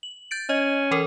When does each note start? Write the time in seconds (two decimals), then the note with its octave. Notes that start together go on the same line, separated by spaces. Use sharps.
0.03 F#7
0.31 G6 A6 D7
0.49 C#4 D#5
0.91 E3 A4 A#4